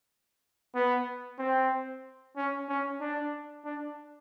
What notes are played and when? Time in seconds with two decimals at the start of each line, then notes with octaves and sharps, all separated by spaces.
0.75 B3
1.39 C4
2.37 C#4
2.69 C#4
3.01 D4
3.65 D4